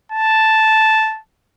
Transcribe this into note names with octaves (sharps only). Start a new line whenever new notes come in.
A5